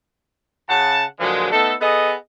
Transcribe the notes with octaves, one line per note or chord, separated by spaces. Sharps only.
C#3 F#5 A5
A#2 D3 F3 F#3 G#3
A3 B3 D#4 A4
B3 G#4 A4 D#5